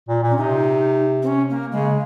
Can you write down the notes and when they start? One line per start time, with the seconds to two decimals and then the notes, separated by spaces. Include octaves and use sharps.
0.08 A#2
0.23 A#2
0.31 C#4
0.38 C3 D#4
1.23 C4
1.27 C#4
1.50 A#3
1.72 C#3 G#3